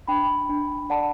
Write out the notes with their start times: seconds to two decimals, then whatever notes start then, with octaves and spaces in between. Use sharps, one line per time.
0.08 D4 G5 B5
0.49 D4
0.90 D5 F#5 A5